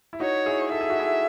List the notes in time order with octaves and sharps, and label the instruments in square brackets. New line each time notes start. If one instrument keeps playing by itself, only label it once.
[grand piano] E4
[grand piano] D#4 F#4 [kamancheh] C#5
[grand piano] E4 G#4
[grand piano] A4 [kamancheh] E5
[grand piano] G#4
F#4
E4 G#4